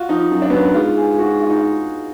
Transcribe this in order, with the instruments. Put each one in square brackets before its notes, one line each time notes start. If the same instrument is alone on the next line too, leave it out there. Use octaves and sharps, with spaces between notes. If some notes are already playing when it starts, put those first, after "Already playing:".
Already playing: [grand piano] F4 F#4
[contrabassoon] F3 [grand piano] D#4
[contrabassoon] F#2
[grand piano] D4
B3
[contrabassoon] F#2 [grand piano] D4
[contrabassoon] G#2 [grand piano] F4
[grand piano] G#4
F#4
F4
D#4
F4